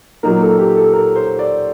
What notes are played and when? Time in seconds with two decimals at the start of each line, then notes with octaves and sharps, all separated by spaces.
0.23 A#2 F#3 A#3 D#4 A#4
0.41 A4
0.59 G4
0.76 A4
0.93 A#4
1.16 C5
1.39 D5